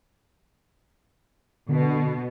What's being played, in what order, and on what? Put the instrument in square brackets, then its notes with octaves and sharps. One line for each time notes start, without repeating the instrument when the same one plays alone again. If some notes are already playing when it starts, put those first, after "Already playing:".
[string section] B2 [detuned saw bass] D3